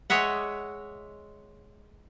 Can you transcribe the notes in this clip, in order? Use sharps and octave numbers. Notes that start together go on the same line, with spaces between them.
G#3 C#5 D#5 E5 F#5